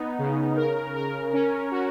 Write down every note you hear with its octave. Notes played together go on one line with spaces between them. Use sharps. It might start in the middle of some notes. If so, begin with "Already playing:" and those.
Already playing: B3 D#4
C#3
A#4
A#4
C#4
F#4